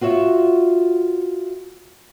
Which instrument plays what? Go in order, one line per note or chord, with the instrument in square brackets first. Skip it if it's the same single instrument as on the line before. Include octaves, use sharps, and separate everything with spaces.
[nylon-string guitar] F4 F#4 C#5 E5